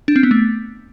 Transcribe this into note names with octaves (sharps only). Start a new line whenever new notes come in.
D4
C4
B3
A3